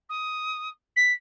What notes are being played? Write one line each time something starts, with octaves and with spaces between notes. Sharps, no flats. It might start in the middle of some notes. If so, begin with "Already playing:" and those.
D#6
B6